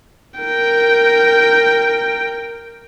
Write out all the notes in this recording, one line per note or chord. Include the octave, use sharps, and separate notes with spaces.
A#4 G5